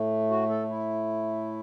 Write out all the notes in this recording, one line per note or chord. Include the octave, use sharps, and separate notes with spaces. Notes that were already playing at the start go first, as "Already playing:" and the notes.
Already playing: A2 A3
F#4
A4
E4